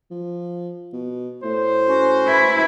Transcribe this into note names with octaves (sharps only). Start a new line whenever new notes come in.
F3
B2
A2 C5
C#4 F#4
E4 B4